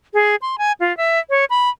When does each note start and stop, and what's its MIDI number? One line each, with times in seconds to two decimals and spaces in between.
0.14 0.35 68
0.42 0.56 84
0.58 0.72 80
0.80 0.95 65
0.97 1.19 76
1.30 1.45 73
1.50 1.69 83